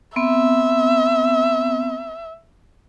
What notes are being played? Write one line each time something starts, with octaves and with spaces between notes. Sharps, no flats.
B3 C4 E5